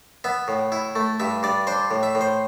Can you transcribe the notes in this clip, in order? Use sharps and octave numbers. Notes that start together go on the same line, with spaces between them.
B3 E5
A2
E4
A3
G2 E5
G2 D5
D4 C5
A2
E5
A2
C5